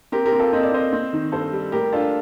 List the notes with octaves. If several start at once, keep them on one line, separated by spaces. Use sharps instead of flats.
C4 G4 A#4
G4 A#4
C4
F4 A4
C4 D#5
D5
C4 C5 D#5
C4
D#3
G2 A4 C5
G3
A2 G4 A#4
D4 F4 A4